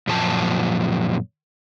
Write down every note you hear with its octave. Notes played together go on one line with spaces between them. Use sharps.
F#2 A#2 F3 A5